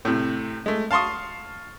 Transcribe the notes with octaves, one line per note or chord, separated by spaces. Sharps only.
A2 C3
G#3 A3
F5 A5 C6 C#6 D#6